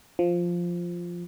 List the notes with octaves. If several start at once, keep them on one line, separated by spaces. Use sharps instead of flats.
F3